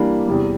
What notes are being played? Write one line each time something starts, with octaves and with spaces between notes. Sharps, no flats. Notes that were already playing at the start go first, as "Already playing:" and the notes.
Already playing: E3 G3 A#3 D4
E2 C3 G3